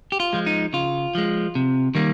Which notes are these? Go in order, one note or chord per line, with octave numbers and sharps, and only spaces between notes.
G4
F4
F3 G#3
D#4
C#3 F4
F3 G#3
C3
D#3 G3 A#3